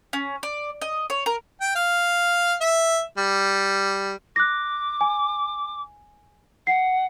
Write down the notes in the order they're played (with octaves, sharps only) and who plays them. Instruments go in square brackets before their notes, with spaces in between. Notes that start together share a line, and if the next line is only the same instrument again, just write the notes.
[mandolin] C#4
D5
D#5
C#5
A#4
[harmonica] G5
F5
E5
G3
[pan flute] D6 [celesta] F#6 A#6
[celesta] G#5
[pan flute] F#5 [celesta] C7